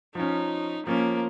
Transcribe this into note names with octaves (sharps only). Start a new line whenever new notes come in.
F3 C#4 D#4
F3 A#3 C#4